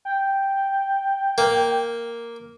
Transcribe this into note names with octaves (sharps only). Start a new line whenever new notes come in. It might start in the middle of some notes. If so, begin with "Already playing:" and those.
G5
A#3